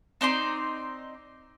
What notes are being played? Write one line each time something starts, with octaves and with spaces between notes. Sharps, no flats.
C4 D#4 D5 C6